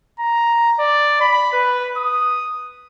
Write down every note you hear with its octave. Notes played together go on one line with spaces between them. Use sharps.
A#5
D5
B5
B4
D#6